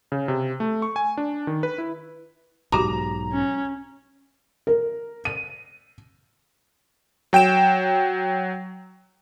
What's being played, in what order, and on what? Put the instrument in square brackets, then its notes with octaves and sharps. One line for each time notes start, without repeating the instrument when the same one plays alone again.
[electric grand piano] C#3
C3
A3
C#6
G#5
D4
D#3
B4
E4
[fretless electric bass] B1 G#2 [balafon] F#4 G4 D6 [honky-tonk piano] A#5
[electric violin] C#4
[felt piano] A#4
D#7
[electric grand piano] F#3 G5 D7 E7